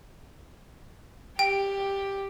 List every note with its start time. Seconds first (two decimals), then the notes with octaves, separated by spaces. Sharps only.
1.39 G4 G5 D7